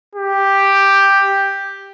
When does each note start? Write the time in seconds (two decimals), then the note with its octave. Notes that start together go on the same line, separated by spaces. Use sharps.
0.15 G4